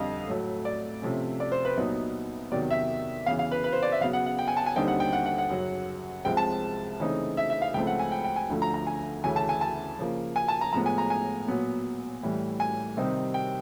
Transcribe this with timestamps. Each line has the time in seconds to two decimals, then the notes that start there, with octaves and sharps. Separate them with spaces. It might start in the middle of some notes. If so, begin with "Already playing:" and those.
Already playing: F2 D3 G3 D#5 F5
0.28 A2 F#3 A3
0.65 D5
1.02 C3 F3 A3 C#4
1.40 D5
1.52 C5
1.65 B4
1.77 C2 A#2 F#3 B3 D#4
2.52 E2 C3 D#3 F#3 D5
2.70 E5
3.26 E2 C#3 E3 F5
3.39 F5
3.51 B4
3.64 B4
3.73 C5
3.83 D5
3.92 E5
4.01 C#3 F#3 B3 F5
4.13 F#5
4.26 F#5
4.39 G5
4.48 G#5
4.57 A5
4.66 G#5
4.76 D#2 D3 G3 C4 D#4 G5
4.88 F#5
5.00 G5
5.13 F#5
5.26 F#5
5.38 F#5
5.50 F#2 C#3 F#3
6.25 C2 C3 F3 G#3 C4 G5
6.37 A5
7.00 C#3 E3 A3 C4 D#4
7.37 E5
7.50 E5
7.62 F5
7.74 C#2 C#3 F3 A3 C4 G5
7.87 F#5
7.99 G#5
8.12 G5
8.24 G5
8.36 G#5
8.50 D2 D3 F3 A3
8.62 A#5
8.74 A#5
8.87 G#5
9.24 D2 C#3 E3 A3 C#4 G#5
9.36 A5
9.49 G#5
9.61 A5
9.99 C#3 F3 A#3
10.36 G#5
10.48 A5
10.61 A#5
10.73 A2 F3 G#3 B3 A#5
10.86 G#5
10.98 A#5
11.10 G#5
11.48 A#2 F#3 B3
12.23 A2 E3 G3
12.60 G#5
12.97 C3 D#3 G3 C4 D#4
13.34 G5